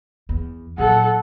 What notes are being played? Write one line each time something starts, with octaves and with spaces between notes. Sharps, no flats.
E2
A#2 F#3 A4 F#5